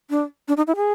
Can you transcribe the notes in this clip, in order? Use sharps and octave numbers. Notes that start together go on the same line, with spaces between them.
D4
D4
D#4
E4
G#4